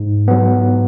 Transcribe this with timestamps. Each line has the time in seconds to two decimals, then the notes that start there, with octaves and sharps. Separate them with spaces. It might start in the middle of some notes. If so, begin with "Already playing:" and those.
Already playing: G#2
0.28 F#3 B3